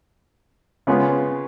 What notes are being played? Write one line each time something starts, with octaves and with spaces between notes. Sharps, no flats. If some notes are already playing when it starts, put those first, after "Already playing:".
C#3 G#3 B3 F4